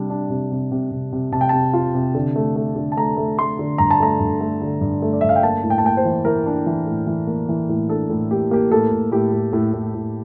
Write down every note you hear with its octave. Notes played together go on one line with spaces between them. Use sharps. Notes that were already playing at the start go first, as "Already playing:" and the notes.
Already playing: C3 G3 D4
D4
C3
C3
C3
C3
C3
C3 A5
G5
C3 A5
F4
C3
D3
A3
A3
D3
A5
A3 A#5
A3
A3 C6
D3
G2 A#5
A5
A3 A#5
G2
A3
D3
G2
A3
D5
G2 E5
F5
G5
A#3 A5
A2
G5
A5
A#3 G5
C5
E3
E3 A#4
D4
E3
A2
E3
A#3
E3
A2
D4 A4
A2
A#3 G4
A#3 G4
A2 A4
A2
A2 G4
A2
A2
A2
A2